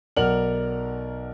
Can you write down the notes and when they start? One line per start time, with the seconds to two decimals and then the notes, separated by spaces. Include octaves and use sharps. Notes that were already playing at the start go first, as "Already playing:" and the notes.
0.16 B1 A#4 D5 F#5 F6 F#7